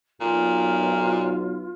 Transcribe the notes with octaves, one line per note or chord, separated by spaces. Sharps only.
B1 A#2 F4